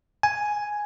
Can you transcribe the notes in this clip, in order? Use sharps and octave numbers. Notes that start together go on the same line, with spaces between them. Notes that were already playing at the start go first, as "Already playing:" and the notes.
G#5